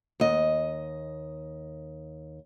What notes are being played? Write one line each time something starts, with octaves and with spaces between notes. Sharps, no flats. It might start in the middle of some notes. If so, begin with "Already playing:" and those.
D#2 D#5